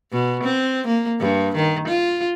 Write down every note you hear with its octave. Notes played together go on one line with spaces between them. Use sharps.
B2
C4
A#3
G2
D#3
F4